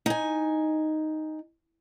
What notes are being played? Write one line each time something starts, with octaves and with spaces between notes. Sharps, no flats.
D#4 G#5